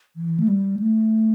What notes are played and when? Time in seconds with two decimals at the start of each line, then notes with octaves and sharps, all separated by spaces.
0.16 E3
0.40 A3
0.48 G3
0.79 A3